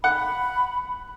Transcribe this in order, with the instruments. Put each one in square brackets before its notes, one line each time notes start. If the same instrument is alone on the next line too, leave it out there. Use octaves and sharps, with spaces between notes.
[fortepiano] F#5 [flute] B5